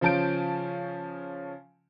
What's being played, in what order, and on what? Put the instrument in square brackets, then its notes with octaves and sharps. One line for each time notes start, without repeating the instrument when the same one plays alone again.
[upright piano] C#3 F3 C#4 A5 G6 D7